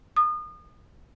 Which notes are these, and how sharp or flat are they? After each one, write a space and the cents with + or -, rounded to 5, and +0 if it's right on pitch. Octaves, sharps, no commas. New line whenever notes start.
D#6 -35